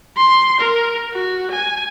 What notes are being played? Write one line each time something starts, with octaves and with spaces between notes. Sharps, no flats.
C6
A#4
F#4
G#5